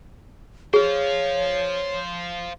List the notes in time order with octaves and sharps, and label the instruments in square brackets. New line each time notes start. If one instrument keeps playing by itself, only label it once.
[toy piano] G#4 [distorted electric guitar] C5 F5 [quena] C#5